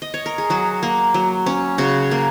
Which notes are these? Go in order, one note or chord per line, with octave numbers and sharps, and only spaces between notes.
D#5
C#5
A#4
G#4
F#3 F#4
A#3
F#3
C#4
C#3 F#4
A#3